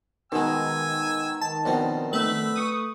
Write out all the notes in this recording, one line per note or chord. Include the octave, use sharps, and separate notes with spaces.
B2 D#3 G#3 G#5 E6
A5
A#1 B2 C4
A3 B4 E5
C#6 D#6